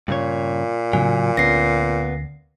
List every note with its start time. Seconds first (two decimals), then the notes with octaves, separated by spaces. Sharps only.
0.08 G2 A#2 C#3 C#5
0.93 A2 C#3 F#3 G#5
1.37 D2 B3 C#4 A#6 C7